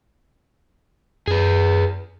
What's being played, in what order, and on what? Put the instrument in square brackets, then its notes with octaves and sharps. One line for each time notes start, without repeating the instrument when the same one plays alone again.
[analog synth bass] F#2 [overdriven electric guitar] G#4 B4